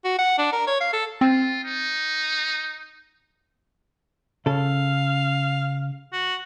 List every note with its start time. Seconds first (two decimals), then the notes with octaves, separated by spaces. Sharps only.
0.05 F#4
0.19 F#5
0.38 D4
0.53 A#4
0.67 C#5
0.81 F5
0.93 A4
1.21 C4 F4
1.64 D#4
4.46 C#3 A4 F5
6.13 F#4